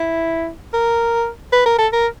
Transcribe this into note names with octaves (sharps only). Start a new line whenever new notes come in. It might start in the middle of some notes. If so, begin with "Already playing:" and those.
Already playing: E4
A#4
B4
A#4
A4
A#4